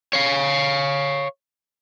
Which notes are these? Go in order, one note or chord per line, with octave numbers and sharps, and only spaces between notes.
C#5 F5